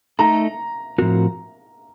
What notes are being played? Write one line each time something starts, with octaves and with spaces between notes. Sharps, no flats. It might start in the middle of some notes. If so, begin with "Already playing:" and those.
A3 D#4 A4 A#5
A2 F3 C4 F#4 A#4